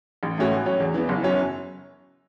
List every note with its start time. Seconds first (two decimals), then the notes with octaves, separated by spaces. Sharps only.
0.23 A1
0.38 A2 A3 C#4 F#4
0.52 A2
0.66 F#3 C#4
0.80 E2
0.94 E3 B3
1.09 F#1
1.23 F#2 F#3 C#4